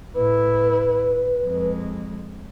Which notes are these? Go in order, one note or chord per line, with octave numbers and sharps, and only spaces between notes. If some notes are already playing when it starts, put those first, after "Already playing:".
A2 E4 B4
F2 G#3